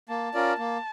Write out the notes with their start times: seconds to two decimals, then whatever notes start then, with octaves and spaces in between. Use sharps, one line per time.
0.09 A#3 A5
0.34 C#4 F4 A#4 D5
0.58 A#3